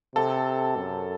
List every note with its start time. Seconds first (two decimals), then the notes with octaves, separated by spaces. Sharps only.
0.15 C3 A4
0.77 F#2